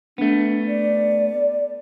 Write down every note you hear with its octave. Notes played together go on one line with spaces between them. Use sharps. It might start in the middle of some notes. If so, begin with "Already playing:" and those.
A3 B3 D4
D5